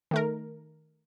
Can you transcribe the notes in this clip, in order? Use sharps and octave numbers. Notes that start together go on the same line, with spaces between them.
D#3 A3 A#4